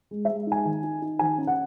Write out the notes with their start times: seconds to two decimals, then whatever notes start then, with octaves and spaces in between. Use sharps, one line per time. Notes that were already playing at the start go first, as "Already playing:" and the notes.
0.11 G#3
0.25 G#3 E5
0.47 D#4 G#5
0.65 D#3
0.83 D#4
1.02 D#4
1.19 D#3 G#5
1.38 C#4
1.47 F#5